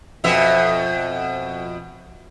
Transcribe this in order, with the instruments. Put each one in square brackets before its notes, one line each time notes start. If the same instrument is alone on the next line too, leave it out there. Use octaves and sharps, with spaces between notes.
[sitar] F2 B2 E5